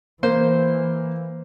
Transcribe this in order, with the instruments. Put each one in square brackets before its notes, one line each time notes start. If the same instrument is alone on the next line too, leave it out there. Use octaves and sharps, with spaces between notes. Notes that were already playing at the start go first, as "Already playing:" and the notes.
[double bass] E3 [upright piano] A#3 [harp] C5